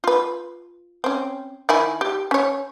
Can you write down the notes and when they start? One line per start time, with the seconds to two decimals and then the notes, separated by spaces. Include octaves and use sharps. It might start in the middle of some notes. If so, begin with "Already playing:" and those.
0.04 F4 B4
1.04 C4 C#4
1.69 D#3 E4 G#5
2.01 G4
2.31 C#4 C#5